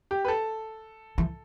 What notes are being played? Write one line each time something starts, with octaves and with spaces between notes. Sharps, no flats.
G4
B4
A4
E3